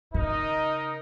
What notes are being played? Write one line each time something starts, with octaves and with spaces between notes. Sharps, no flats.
C#3 D#4 A#4 D#5